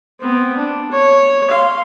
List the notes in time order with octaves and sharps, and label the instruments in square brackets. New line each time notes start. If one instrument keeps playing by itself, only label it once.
[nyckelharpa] B3 C4
D4
C#5
F5 C6